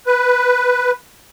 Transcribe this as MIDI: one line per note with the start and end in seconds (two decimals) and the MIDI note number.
0.07 0.91 71